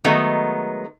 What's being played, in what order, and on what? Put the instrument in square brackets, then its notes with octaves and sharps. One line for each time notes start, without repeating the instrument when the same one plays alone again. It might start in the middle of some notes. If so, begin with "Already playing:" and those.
[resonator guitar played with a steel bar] D#3 F#3 G#3 A3 B3 D#4